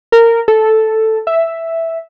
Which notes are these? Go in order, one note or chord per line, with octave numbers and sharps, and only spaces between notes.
A#4
A4
E5